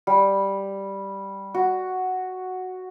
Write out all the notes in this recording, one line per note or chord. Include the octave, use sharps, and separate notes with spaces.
G3
F#4